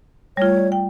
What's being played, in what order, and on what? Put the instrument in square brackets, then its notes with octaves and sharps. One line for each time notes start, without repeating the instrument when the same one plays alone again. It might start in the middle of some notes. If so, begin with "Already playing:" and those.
[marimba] G3 A3 F4 [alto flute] C#5
[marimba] D5
G5